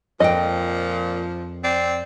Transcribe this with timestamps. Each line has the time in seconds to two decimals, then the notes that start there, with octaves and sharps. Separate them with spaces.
0.20 F2 A#2 F3 D#5 G5
1.64 C4 D5